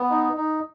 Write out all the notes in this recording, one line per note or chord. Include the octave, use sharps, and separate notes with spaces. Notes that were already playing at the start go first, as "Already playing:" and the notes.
Already playing: B3
D#4
D#4